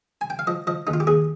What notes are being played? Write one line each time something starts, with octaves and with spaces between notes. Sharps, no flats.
G#5
G5
F5
F3 D#5
F3 D#5
D#2 D#4
F4
G4
D#2 G#4